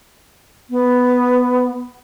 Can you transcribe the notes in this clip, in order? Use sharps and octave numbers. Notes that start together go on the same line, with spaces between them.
B3